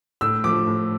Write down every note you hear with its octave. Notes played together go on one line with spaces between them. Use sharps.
A2 E6
F3 A3 D6
A2